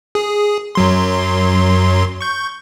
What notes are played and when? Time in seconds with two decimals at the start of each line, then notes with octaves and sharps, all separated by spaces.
0.15 G#4
0.75 F#2 F#3 C6
2.21 C#6 G6